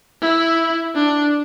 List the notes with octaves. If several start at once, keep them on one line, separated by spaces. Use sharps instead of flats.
E4
D4